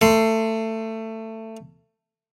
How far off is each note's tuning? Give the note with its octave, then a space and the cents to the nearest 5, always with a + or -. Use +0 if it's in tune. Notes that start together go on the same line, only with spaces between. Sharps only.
A3 +20 C6 +0